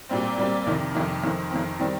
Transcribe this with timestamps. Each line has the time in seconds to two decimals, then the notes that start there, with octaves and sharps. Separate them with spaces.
0.09 A#2 G3 C4
0.38 A#2 G3 C4
0.67 F2 C3 D#3
0.95 F2 C3 D#3
1.23 F2 D#3 C4
1.51 F2 D#3 C4
1.79 D#3 G3 C4